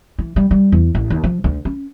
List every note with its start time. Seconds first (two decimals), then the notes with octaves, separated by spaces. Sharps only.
0.19 E3
0.36 G3
0.51 G3
0.72 E2
0.95 A1
1.10 D#2
1.24 F3
1.44 D2
1.65 C#4